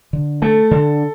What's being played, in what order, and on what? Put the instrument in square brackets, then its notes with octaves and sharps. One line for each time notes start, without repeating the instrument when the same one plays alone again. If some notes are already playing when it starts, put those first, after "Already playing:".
[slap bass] D3
[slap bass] A3 [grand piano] A4
[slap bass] D3